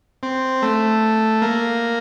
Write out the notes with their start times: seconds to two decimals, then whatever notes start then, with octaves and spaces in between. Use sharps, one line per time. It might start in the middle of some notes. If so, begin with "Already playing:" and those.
0.23 C4
0.62 A3
1.42 A#3